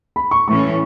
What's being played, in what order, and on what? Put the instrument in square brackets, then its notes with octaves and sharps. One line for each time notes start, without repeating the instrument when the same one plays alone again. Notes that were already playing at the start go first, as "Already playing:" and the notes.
[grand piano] B5
C#6
[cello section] A2 E3 A3 C#4 [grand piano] C#6